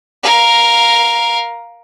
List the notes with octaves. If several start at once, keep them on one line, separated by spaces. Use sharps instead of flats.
A#4 F5